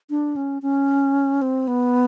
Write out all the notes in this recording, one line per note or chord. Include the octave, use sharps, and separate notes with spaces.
D4
C#4
C#4
C4
B3